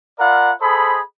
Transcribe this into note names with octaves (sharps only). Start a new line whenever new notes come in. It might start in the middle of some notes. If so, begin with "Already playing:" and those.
F4 A#4 D5 F5 F#5 B5
G#4 A4 C5 D#5 B5